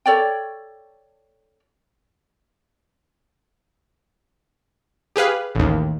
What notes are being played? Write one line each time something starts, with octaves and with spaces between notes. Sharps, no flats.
A4 C#5 D5 G5
G4 G#4 B4 F5
A1 D#2